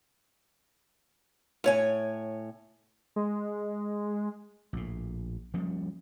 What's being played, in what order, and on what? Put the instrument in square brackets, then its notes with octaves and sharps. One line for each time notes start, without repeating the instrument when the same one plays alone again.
[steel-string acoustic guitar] A2 C#5 G#5
[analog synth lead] G#3
[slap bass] A#1 A2
F3 G3 A#3 C#4